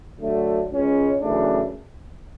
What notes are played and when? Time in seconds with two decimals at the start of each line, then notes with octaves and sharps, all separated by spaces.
0.20 D3 F#3 A3
0.69 C#2 C#3 G#3 C#4
1.20 F#2 C#3 E3 A3 D4